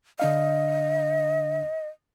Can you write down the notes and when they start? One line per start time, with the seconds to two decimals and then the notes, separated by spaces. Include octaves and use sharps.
0.20 D3 D4 D#5 F5